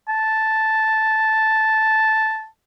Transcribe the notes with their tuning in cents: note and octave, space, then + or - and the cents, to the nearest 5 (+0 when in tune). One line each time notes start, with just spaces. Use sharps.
A5 -5